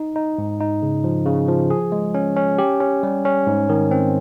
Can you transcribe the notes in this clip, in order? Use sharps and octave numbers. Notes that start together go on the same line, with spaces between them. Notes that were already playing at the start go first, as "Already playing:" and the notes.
Already playing: D#4
D#4
G#2
D#4
C#3
F3
C#3
F3
G#4
G#3
C#4
C#4
G4
C#4
G3
C#4
G#2
D#3
C4